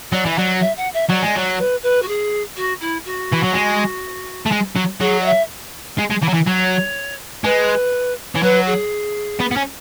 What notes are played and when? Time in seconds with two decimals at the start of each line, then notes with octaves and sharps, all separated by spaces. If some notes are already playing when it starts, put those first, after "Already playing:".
0.12 F#3 D5
0.26 E3
0.37 F#3 D5
0.61 E5
0.77 F#5
0.94 E5
1.10 F#3 D5
1.23 G#3
1.36 F#3
1.59 B4
1.83 B4
2.02 F#4
2.08 G#4
2.56 F#4
2.80 E4
3.05 F#4
3.33 E3
3.44 F#3
3.54 G#3
4.46 A3
4.52 G#3
4.76 F#3
5.00 F#3 G#4
5.21 D5
5.25 E5
5.99 G#3
6.11 G#3
6.23 E3
6.29 F#3
6.35 E3
6.47 F#3 C#5
7.44 G#3 B4
8.34 E3 C#5
8.43 F#3 B4
8.67 G#4
9.40 B3
9.51 B3
9.56 C#4